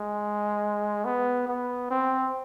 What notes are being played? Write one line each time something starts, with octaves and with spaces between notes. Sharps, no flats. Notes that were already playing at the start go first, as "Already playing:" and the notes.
Already playing: G#3
B3
B3
C4